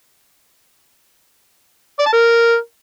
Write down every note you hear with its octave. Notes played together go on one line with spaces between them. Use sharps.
D5
A5
A#4